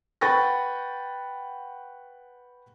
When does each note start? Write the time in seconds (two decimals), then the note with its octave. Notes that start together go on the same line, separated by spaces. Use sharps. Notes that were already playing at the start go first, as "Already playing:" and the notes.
0.21 B4 F#5 G5 C#6 A6 A#6